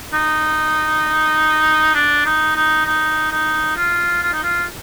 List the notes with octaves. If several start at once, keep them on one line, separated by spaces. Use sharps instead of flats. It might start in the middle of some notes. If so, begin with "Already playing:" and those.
D#4
D4
D#4
D#4
D#4
D#4
F4
F4
D#4
F4